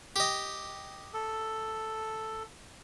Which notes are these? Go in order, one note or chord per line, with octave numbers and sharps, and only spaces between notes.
G4 D#5
A4